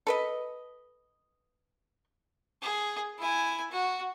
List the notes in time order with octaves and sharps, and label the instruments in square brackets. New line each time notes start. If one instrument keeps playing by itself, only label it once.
[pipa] A4 B4 D#5
[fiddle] G#4
E4 G#5
F#4